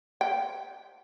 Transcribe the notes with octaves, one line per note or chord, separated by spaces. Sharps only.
G5